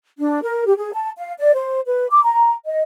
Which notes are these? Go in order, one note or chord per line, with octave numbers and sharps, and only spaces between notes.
D4
A#4
G4
G#4
A5
F5
D5
C5
B4
D6
A#5
D#5